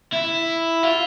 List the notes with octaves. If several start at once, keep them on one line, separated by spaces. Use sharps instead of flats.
E4
F4